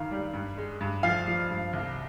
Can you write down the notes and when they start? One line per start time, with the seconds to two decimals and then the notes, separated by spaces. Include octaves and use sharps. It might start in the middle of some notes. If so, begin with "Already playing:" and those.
Already playing: G2 D#3 F5
0.11 G3
0.34 G2
0.58 G#3
0.81 G2
1.03 F3 F5
1.27 F3
1.51 G2
1.73 C2